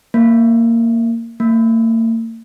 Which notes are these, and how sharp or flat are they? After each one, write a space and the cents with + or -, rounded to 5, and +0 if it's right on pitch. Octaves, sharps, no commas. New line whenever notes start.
A#3 -15
A#3 -45